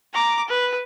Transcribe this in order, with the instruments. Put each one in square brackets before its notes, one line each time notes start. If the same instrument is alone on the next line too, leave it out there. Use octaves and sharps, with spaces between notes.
[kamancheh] A#5 D6
B4